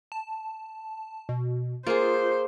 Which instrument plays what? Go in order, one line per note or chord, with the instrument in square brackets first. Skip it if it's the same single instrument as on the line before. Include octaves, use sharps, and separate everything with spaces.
[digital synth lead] A5
B2
[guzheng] A#3 G#4 [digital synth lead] F4 [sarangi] C5